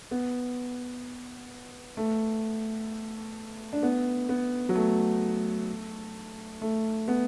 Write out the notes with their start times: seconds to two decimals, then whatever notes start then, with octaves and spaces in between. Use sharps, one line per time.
0.11 B3
1.97 A3
3.73 D4
3.83 B3
4.29 B3
4.69 F#3
4.75 A3
6.62 A3
7.08 B3